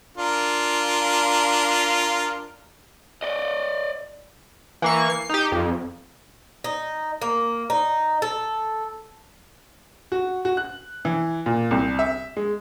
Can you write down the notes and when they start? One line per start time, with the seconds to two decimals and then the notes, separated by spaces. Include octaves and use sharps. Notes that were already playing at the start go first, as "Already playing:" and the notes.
0.17 D4 F4 A#4
3.23 D5 D#5
4.82 E3 A#3 C#6
5.10 C7
5.29 D#4 G4
5.52 F2
6.64 D#4
7.22 A#3
7.70 D#4
8.22 A4
10.12 F#4
10.45 F#4
10.57 F#6
11.05 E3
11.46 A#2
11.71 C2
11.99 E5
12.37 G#3